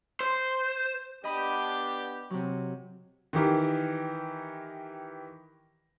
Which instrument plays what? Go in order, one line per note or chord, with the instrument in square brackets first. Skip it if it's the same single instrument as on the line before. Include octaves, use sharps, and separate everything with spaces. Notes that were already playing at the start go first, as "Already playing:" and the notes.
[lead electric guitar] C5
[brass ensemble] B3 D4 G4 [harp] D#5 B5
[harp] C3 F#3
[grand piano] D#3 E3 G4 A#4